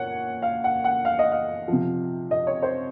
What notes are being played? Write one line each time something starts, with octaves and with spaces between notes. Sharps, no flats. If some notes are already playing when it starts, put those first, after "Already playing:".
Already playing: A#2 C#5 F#5
F5
F#5
F#5
F5
D#5
F5
C3 F3
D#5
C#5
C5